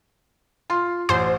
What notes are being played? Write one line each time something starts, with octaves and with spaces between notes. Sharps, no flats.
F4 C6
A1 C5